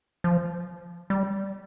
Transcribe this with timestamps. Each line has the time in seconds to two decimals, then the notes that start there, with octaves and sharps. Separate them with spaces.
0.24 F3
1.10 G3